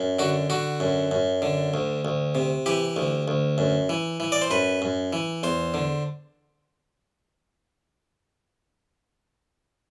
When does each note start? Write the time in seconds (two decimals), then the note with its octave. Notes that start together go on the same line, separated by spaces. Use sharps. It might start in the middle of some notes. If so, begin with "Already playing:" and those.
Already playing: F#2
0.19 D3 F#4
0.50 D3 F#4
0.80 F#2
1.11 F#2
1.42 D3
1.74 D2
2.05 D2
2.35 C3
2.66 E3 G4
2.96 D2
3.28 D2
3.58 F#2
3.89 E3
4.20 E3
4.32 D5
4.42 C5
4.51 F#2 B4
4.82 F#2
5.13 E3
5.43 E2 C5
5.74 D3